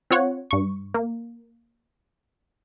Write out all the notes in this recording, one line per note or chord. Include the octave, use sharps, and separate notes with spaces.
C4 F4 C#5 F#5
G2 C#6
A#3